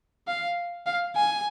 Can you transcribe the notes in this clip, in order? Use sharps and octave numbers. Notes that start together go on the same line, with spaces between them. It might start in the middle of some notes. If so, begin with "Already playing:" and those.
F5
F5
G#5